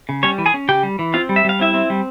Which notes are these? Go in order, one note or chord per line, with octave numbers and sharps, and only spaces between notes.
C#3
G3 C#4 C#5
E3
G#4 G#5
C#4
C#3 G4 G5
G3
E3
C4 F4 F5
G3
E5
G3 F5
C4 E4 E5
C4
G3